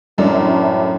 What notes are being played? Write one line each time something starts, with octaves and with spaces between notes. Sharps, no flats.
F#2 A2 D4